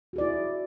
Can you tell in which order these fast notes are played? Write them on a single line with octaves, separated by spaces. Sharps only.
F#4 G#4 D5 E4